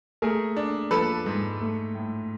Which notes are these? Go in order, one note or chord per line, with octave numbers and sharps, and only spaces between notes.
A3 G#4 A#4
D4
F3 A4 B4
G#2
A3
A2